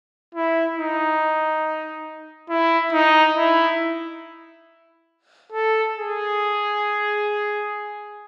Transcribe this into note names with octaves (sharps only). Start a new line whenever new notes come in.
E4
D#4
E4
D#4
E4
A4
G#4